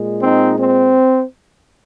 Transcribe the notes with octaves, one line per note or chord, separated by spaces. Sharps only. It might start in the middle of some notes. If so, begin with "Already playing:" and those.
Already playing: A#2 G#3
C4 D#4
C4